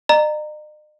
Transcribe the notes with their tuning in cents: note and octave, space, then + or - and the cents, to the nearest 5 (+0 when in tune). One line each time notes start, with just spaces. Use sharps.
D#5 -45 A#5 -10